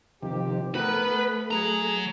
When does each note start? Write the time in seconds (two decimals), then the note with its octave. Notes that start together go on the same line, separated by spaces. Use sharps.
0.23 C3 D#3 F3 G4
0.75 A3 B3 A#4 B4 F#5
1.51 F#3 G#4 A#5